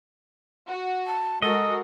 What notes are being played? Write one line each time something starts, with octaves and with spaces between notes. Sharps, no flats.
F#4
A5
G#3 F#4 A4 A#4 D#5